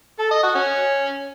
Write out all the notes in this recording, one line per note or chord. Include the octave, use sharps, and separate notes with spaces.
A4
D#5
F#4
C#4